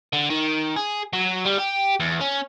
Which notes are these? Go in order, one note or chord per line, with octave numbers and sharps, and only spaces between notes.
D3
D#3
G#4
F#3
G3
G4
E2
C#4